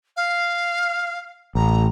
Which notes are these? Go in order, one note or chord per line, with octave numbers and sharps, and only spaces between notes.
F5
A1 A#5